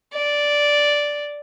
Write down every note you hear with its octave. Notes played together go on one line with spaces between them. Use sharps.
D5